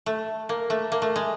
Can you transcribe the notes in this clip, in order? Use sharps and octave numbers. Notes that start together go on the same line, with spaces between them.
A3
A#3
A3
A#3
A3
G#3